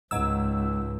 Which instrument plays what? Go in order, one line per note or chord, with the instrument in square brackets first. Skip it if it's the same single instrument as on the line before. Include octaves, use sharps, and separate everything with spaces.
[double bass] C#2 [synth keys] G#2 E6